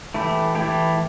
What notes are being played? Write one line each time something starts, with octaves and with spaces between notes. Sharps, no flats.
E3 A3 E4 G4
E3 A3 E4 G4